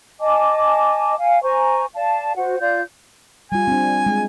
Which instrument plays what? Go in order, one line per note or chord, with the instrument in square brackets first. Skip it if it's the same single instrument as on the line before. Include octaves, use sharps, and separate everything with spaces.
[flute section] D#5 G#5 A5 D6
F5 G#5
C5 G#5 A#5 C#6
D5 F5 A5
F#4 C5 F#5
F4 D5 F5 G6
[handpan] G3 F4 [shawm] G#5
[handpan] C4 D4
G#3